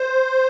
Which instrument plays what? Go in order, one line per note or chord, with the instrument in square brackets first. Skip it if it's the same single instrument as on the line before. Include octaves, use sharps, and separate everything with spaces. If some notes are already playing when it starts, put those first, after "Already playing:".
Already playing: [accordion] C5